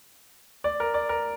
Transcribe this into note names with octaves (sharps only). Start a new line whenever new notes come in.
D5
A#4
D5
A#4